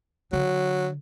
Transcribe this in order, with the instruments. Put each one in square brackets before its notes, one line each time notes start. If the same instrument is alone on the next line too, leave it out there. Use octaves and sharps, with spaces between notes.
[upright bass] D3 [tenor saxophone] F#3